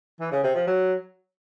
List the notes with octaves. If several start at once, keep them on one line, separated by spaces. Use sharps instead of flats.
E3
C#3
C3
F3
F#3